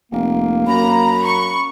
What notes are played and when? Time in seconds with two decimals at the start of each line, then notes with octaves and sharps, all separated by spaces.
0.12 F1 A#3
0.67 F#2 A#5 B5
1.25 C#6